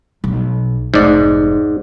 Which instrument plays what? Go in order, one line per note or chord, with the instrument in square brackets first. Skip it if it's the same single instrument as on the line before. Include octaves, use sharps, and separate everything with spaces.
[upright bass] B1
[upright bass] F1 [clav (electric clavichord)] G#2 D5